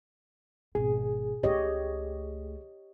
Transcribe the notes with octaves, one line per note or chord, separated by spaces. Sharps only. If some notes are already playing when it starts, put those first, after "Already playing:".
G#1 B2 G#4
C#2 A3 G4 C#5 D#5